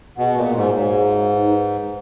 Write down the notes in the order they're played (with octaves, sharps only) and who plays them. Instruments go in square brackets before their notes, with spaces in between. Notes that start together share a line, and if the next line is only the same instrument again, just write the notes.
[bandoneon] B2 [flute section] G#4 D#5 F#5
[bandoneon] A#2
G#2
[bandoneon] G#2 [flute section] F#4 C#5 F5
[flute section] D#4 G#4 B4